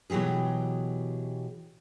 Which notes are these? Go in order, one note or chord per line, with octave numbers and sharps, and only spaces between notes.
B2 E3 F#3 G4 G#4